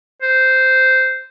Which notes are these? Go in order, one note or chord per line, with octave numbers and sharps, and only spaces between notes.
C5